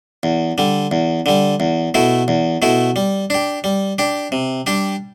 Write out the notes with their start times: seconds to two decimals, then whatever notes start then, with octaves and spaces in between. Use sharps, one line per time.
0.23 E2
0.58 D3 G3
0.91 E2
1.26 D3 G3
1.60 E2
1.94 B2 A3 E4
2.28 E2
2.62 B2 A3 E4
2.96 G3
3.30 D4 G4
3.64 G3
3.98 D4 G4
4.32 C3
4.66 G3 D4 G4